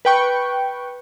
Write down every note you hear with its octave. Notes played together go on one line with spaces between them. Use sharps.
B4 G5 C#6